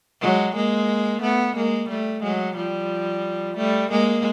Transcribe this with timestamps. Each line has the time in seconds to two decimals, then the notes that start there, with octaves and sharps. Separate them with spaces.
0.21 F#3 G#3
0.56 G#3 A#3
1.22 A3 B3
1.55 G#3 A#3
1.89 G3 A3
2.23 F#3 G#3
2.56 F3 G3
3.57 G3 A3
3.90 G#3 A#3